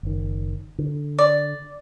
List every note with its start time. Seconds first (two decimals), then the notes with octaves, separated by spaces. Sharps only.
0.03 F#1 D#3
0.78 D3
1.19 D5